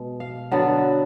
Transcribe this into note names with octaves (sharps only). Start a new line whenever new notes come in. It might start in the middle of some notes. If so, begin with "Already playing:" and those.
Already playing: B2 G#3
F5
D3 F#3 B3 D4